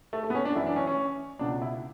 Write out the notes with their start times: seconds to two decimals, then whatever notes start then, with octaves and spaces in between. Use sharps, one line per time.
0.13 A3
0.23 A3
0.30 B3
0.35 C#4
0.45 D4
0.55 F#2 E3 E4
0.66 D4
0.76 C#4
0.87 C#4
1.39 C#2 B2 D4
1.62 E4